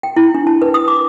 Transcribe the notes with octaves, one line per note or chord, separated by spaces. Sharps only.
G5
E4
D4
A5
B4
D#6
D6